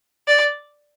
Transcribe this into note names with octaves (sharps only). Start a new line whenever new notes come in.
D5